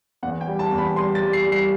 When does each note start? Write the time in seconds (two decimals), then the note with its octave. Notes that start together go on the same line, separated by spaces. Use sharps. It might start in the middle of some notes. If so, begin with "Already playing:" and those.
0.23 E2 F#5
0.41 G5
0.47 G3
0.59 A5
0.72 E2
0.78 B5
0.96 G3 C6
1.15 A6
1.21 G3
1.33 C7
1.46 G3
1.52 C7